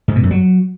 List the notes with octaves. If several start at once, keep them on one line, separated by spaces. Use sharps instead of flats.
G#2
B2
F#2
F#3